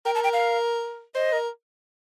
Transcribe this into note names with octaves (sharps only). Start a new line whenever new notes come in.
A#4 G5
A5
G5
F5
C5 D#5
A#4